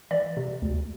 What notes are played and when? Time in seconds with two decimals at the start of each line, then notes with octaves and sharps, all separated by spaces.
0.11 E3 D5
0.37 C3
0.62 D2